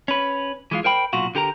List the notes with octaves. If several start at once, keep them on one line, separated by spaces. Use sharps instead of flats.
C#4 B4
E3 G#3 F4
A#4 C5 G5 B5
B1 A#2 F4 F#4
D3 G4 A#4 A#5